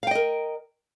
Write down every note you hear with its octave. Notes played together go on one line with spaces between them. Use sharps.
A#4 D#5 F5 G5